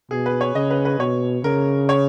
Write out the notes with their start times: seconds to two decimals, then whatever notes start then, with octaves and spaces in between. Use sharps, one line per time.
0.11 B2 G#4
0.26 B4
0.41 C#5
0.55 C#3 D#5
0.70 B4
0.85 B4
0.99 B2 C#5
1.44 C#3 A#4
1.89 C#5